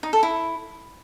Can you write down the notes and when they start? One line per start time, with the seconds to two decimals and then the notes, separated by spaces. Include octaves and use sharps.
0.03 D#4
0.13 A4
0.23 E4